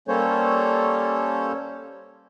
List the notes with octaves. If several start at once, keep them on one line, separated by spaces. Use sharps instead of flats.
G3 A#3 C#4 A4 C5 C#5